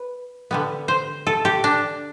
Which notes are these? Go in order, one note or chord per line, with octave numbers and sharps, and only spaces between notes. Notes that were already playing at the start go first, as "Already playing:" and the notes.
Already playing: B4
D3 G3 B3
C5
A4
G4
D4